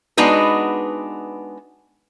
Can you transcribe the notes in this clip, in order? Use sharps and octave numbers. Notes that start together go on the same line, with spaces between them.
G#3 B3 D4 D#4 F#4 B4